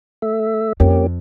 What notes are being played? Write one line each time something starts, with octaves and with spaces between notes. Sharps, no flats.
A3 E5
F2 A#3 C#4 G4